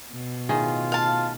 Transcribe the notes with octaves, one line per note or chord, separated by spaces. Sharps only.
B2
A2 D#3 F4 G#4
F5 A5